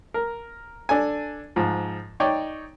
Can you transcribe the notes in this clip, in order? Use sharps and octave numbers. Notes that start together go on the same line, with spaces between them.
A#4
D4 A4 G#5
G#2 F3
D#4 C#5 D5 G5